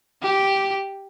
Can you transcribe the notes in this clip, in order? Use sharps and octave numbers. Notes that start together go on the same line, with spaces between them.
G4